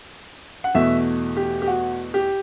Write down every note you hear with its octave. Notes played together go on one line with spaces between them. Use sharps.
F#5
E2 B2 A3 E5
G4
G4
F#4
G4